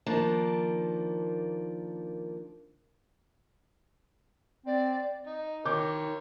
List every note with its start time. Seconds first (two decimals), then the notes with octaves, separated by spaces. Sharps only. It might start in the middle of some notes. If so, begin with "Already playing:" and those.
0.06 D#3 F3 A#3 D4
4.66 C4 D5
5.27 D#4
5.65 D#3 A#4 C#5 D6 G6